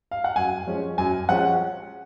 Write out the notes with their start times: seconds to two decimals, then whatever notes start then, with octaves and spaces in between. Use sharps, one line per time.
0.11 F5
0.24 F#5
0.36 F#2 G#5
0.67 F3 G#3 C#4
0.98 F#2 G#5
1.29 F3 G#3 C#4 F#5